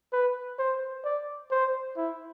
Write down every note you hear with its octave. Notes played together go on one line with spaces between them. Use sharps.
B4
C5
D5
C5
E4